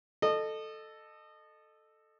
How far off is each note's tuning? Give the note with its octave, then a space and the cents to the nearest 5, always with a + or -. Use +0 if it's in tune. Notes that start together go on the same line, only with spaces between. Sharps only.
A4 +0 D#5 -25